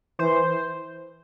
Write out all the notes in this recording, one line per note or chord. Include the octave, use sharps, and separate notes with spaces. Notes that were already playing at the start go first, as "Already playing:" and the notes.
E3 C5